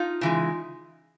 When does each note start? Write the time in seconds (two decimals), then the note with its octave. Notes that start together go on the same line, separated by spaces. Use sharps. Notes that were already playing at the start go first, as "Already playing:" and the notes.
Already playing: D#4 F4
0.21 C#3 E3 G#3